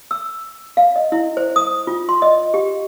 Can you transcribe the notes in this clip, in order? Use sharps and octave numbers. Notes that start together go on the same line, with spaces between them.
E6
F5
D#5
E4
C5
D#6
F4
C6
D#5
G4